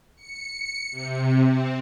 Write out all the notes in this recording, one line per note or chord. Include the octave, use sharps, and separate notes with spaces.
C#7
C3
C4